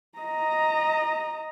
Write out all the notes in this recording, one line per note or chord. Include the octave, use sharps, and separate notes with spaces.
D#5 A#5